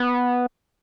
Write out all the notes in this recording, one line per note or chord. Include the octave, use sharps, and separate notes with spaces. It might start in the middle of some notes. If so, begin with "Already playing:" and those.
Already playing: B3